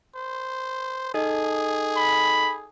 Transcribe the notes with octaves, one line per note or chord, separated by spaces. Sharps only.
C5
D#4 G#4 A4 D#5
B5